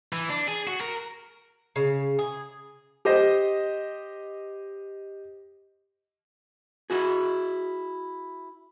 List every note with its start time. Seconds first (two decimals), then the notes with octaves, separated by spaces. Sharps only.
0.13 E3
0.30 D4
0.48 G#4
0.67 F#4
0.81 A#4
1.76 C#3
2.19 G#4
3.05 G4 C5 D#5
6.90 E4 F#4 G#4